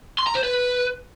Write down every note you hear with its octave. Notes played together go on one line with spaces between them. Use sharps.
C6
A#5
C5
B4